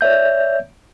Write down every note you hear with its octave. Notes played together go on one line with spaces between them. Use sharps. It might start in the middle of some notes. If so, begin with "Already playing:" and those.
C#5 D5 E5 G6